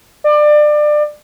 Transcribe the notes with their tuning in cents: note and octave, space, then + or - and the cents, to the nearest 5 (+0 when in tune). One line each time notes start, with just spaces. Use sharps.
D5 +25